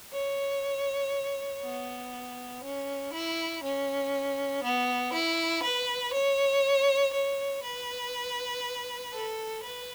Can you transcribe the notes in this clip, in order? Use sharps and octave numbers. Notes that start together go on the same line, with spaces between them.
C#5
B3
C#4
E4
C#4
B3
E4
B4
C#5
C#5
B4
A4
B4